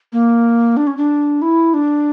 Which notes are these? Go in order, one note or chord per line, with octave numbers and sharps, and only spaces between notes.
A#3
D4
C#4
D4
E4
D4